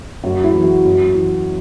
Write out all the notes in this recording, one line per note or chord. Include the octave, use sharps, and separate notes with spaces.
F#2 F#4
E4
E3
F#4
F#2
E3